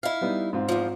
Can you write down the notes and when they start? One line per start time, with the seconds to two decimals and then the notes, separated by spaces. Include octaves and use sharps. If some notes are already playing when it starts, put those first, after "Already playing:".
0.03 E4 F5
0.21 G3 B3 D#4
0.53 G#2 C4 F4
0.69 E2 F3